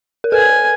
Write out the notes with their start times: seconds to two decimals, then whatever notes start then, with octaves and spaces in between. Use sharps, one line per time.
0.24 A#4
0.32 A4 B4 G#5